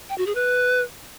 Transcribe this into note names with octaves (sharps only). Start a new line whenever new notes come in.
G5
F#4
G#4
B4